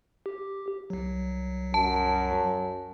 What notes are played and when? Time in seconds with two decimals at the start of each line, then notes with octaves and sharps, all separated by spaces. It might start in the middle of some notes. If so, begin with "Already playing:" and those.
0.26 G4
0.90 C2 F#3
1.74 F#2 A5